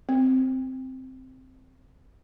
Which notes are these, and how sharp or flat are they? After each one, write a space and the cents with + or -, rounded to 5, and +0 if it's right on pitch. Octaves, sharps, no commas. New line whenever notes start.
C4 -5